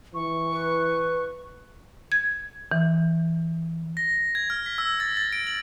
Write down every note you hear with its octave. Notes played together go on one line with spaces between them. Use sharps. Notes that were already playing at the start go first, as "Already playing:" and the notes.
E3 C#6
B4
G#6
E3
A#6
G#6
F6
B6
E6
A6
A6
D7
F#7